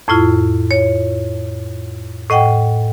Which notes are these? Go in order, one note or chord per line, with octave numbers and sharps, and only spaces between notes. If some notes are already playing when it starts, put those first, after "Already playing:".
F2 A2 E4 F4
C#5
A2 D#5 F#5 G5